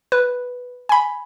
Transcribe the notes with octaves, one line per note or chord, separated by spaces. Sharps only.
B4
G#5 B5